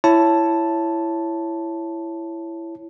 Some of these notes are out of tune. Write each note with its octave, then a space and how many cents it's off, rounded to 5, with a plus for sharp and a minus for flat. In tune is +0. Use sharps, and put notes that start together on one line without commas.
E4 +15 C#5 +0 A5 +0